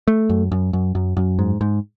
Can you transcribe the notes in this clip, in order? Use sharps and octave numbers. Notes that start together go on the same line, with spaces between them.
A3
F#2
F#2
F#2
F#2
F#2
G#2
G#2